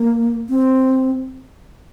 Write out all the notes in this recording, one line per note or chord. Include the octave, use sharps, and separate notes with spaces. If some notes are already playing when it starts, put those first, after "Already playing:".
Already playing: A#3
C4